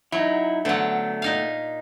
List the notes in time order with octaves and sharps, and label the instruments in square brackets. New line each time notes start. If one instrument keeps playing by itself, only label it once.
[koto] F#3 [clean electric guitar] D#4 E4
[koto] D3 F#3 [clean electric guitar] A3 B3
[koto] A#2 D#4 F5